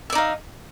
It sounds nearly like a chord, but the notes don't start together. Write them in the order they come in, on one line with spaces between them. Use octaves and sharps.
E5 D5 D#4 F5